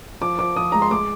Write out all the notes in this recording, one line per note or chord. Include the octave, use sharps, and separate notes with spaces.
F3 D6
F3 D6
F3 D#6
G#3 A#5
C6
G#3 D6